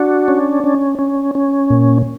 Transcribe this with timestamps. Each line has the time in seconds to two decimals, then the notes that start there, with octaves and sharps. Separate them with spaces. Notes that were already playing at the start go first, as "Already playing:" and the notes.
Already playing: D4 F#4
0.28 C#4
0.64 C#4
0.99 C#4
1.35 C#4
1.70 A#2